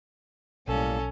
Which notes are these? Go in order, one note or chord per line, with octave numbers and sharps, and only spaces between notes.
B1 A2 G3 A#3 C#4 A4